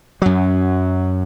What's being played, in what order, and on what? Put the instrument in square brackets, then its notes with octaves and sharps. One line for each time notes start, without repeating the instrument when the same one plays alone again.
[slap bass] F#2 F#3